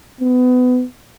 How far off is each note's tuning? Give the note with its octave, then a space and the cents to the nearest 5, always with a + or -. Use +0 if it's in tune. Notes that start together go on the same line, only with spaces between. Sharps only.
B3 +25